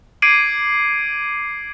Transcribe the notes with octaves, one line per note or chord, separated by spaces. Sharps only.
D6 G#6 C7 D7 D#7 F#7